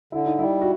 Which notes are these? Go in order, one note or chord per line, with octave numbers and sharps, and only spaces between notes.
D3 E4
D#4
G3 E4
F#4